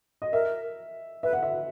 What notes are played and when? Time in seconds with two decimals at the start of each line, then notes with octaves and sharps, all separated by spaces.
0.22 D#5
0.33 A#4 E5
1.23 B4 E5
1.33 F#5
1.43 E5